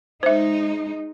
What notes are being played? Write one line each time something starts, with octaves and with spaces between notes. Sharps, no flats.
G#3 D#4 C5 E5